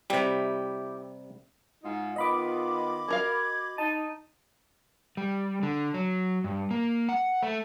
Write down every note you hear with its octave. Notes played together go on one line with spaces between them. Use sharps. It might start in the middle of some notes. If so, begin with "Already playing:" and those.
C3 G3 E4 G4 E5
G#2 D#4 F4
D#3 B3 F4 D#5 B5 D6
F#4 A#4 F5 G#6
D#4 A5 D#7
G3
D3
F#3
G2
A#3
F#5
A3